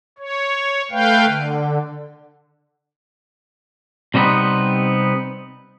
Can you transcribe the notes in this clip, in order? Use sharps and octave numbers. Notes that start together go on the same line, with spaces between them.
C#5
A3 B4 F5 G5
D3
C3 G3 A3 B3 C4 D#4